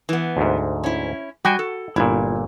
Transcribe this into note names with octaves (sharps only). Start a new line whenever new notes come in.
E3 B3
D2 G#2
C#4 E4
G3 F#4 G5 G#5
A4
G1 A#2 E4